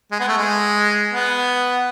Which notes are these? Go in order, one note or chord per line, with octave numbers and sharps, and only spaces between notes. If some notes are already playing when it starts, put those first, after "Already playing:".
G#3
B3
A3
G#3
B3